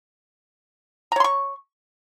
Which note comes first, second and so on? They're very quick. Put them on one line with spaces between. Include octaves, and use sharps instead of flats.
A#5 C#5 C6 C#6